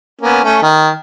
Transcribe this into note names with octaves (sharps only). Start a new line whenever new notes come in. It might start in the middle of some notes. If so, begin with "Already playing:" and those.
A#3 B3 C#4
A3 C#4
D#3